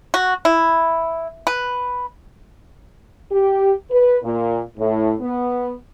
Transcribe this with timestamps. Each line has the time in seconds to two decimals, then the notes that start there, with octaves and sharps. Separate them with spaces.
0.14 F#4
0.45 E4
1.47 B4
3.32 G4
3.91 B4
4.23 A#2
4.77 A2
5.20 B3